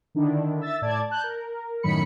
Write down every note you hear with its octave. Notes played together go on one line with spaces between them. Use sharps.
D3 D#3 D4 E4
E5 E6 A6
A2 D5 A5 G#6
A5 F#6 G6
A#4
F#2 A2 D#3 F#3 B5 C#7